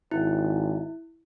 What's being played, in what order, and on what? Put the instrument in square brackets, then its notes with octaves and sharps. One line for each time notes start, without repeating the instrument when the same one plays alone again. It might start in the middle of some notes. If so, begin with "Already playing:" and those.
[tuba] G#1 [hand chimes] E4